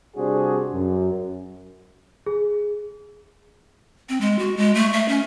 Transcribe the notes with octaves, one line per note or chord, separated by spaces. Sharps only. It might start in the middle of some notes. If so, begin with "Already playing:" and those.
C3 G3 D4 F#4 G#4 C5
F#2
G#4
C4
G#3
F#4
G#3
A3
E5
C#4